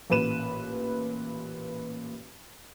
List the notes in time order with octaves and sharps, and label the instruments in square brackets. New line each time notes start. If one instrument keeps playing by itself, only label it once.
[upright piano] A1 A#2 B4 D#7 E7